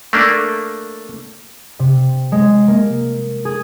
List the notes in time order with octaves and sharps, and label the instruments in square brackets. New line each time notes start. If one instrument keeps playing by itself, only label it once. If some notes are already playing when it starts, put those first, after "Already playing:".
[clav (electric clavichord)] A3 A#3 D4
[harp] C3
G#3
A#3
G#4